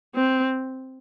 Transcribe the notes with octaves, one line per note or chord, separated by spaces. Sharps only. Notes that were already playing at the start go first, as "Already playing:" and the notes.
C4